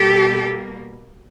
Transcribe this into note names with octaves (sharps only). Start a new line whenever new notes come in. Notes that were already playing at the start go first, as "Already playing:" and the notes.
Already playing: B2 G3 A#3 G4 A4